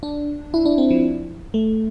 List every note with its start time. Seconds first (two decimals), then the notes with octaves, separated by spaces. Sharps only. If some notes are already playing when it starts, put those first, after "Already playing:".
0.03 D4
0.54 E4
0.65 D4
0.78 C4
0.90 F3
1.54 A3